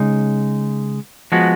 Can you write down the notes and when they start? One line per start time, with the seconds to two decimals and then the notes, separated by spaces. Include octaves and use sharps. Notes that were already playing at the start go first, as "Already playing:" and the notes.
Already playing: C#3 G#3 D#4
1.32 F3 G#3 B3 F#4